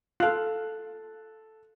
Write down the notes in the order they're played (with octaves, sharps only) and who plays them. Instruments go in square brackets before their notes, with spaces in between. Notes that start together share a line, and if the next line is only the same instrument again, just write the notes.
[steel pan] F4 F5 [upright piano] A4 F#6